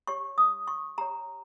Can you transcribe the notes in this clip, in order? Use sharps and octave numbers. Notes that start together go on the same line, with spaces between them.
G4 C#5 C#6
D#6
C#6
G4 C#5 A#5